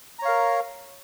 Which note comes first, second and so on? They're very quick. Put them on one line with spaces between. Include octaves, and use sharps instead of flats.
A#5 C#5 F5 A#4